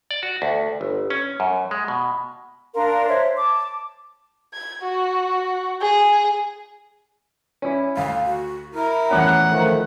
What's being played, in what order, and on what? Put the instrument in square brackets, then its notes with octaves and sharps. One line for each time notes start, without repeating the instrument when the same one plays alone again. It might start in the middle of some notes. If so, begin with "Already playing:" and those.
[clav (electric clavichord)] D5
F#4
D2
G1
C#4
F#2
G#3
B2
[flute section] D4 A#4 F5 C6
C5 C#5 E5
A5 D6
[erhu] G#6
F#4
G#4
[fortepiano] C#4 E4
[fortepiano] D2 [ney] F5
[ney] F#4
[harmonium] E4 A#4 [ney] A#5
[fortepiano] E2 A2 C#4 [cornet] F#5
[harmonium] D#3 F3 A3